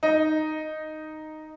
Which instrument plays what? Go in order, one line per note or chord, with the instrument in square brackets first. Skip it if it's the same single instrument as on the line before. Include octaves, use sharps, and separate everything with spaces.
[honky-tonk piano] D#4